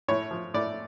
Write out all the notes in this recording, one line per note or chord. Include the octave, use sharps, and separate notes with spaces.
A2 C#5
F3
A2 D5